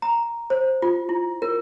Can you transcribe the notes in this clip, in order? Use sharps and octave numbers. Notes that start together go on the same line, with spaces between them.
A#5
C5
F4
E4
A#4